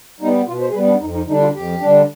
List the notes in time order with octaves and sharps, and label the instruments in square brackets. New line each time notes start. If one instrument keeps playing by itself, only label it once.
[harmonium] G3 B3 D#4
B2 F4
C5
G#4
G3 B3 B4
D4
F2 D#4
D#4
D3 G3 D4 D#4
F4
F2 G4
D3 G3 D4